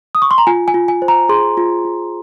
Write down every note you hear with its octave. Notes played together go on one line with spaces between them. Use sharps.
D#6
C#6
C6
A#5
F4 G#5
G#5
F4
G#5
C5
A#5
G#4 C6
F4
F4